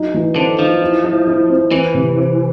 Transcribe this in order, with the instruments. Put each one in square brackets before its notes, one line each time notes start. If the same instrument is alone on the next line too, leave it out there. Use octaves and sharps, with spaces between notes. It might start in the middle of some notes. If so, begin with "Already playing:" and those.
Already playing: [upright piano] F#3 D#4
E3
[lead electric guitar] D3 [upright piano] C4
[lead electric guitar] F3 [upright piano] D#4
[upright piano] E4
E4
E4
C4
[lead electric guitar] E3 [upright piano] C4
[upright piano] C3
C4